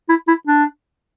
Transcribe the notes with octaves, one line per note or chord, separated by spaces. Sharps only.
E4
E4
D4